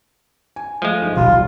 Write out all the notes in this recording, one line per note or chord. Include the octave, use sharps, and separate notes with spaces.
G#5
F3 G#3 A3
G#1
D#1 B1 B2 G3 F4